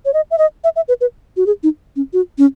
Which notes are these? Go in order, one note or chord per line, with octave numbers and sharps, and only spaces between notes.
C#5
D#5
E5
D#5
E5
E5
B4
B4
F#4
G#4
D#4
C#4
F#4
C#4